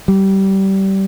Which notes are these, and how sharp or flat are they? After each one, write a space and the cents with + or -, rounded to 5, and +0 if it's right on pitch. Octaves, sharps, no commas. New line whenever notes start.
G3 -20